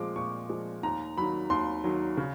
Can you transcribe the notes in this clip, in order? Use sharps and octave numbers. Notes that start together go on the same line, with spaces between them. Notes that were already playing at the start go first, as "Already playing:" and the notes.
Already playing: A#2 F3 G#3 D6
A#2 C#6
F3 G#3
D#2 A#5
D#3 F#3 B5
D#2 C6
D#3 F#3
C#3